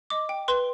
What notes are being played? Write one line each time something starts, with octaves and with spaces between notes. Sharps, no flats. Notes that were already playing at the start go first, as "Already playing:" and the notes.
D#5 D6
G5
B4 C6